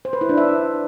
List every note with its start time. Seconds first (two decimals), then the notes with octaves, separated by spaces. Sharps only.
0.05 C5
0.13 B4
0.21 E4
0.29 D4
0.38 E5